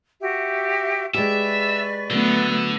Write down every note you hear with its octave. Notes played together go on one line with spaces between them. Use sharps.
F#4 G4 E5
G#3 G4 B4 D5 E5 C#6
D3 F#3 A3 B3